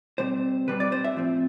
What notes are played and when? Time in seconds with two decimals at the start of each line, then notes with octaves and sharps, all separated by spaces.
0.18 B2 G3 C4 C5
0.68 B2 G3 C4 B4
0.80 D5
0.92 C5
1.04 E5
1.16 A2 F3 C4